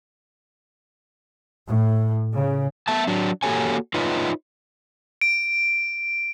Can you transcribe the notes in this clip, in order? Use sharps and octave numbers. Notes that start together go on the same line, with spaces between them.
A2
C#3
B3 E5 A5
F#3 D4
A#3 F#4 G4 A4 C#5 G#5
D#4 F4 B4 C#5 D#5
D7